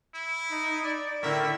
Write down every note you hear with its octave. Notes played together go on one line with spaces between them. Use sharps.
E4
D#4
D5
A2 D3 E4 A#4 E5